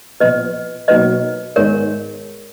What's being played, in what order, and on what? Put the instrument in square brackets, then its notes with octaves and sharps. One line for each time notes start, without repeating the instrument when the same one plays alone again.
[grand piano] A#2 F3 B3 [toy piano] B4 D#5
[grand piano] B2 F#3 A#3 D#4 [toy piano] B4 D#5
[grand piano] G#2 D#3 G#3 B3 D#4 [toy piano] A#4 C#5